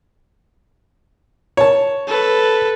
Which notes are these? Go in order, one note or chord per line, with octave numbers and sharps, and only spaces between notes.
C#5 A5
A4 B4